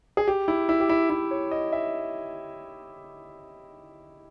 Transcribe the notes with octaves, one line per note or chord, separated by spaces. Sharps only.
G#4
G4
E4
E4
G4
E4
E4
C#5
D#5
E5